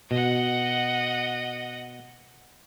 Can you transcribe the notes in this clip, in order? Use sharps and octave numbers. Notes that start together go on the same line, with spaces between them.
B2 D#5 F#5